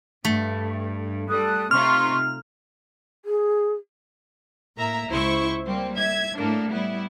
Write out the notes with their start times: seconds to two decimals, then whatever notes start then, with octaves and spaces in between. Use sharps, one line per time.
0.25 G2 A3
1.29 G3 A4 D#6 F#6
1.71 C3 D#4 F4 C6 C#6 F6
3.25 G#4
4.77 A2 A#3 E5 A#5
5.08 C#2 E4 C5 C#6
5.65 G3 A#3 C4
5.98 E5 G#6
6.36 A2 A3 A#3 D4
6.72 G3 B3 E4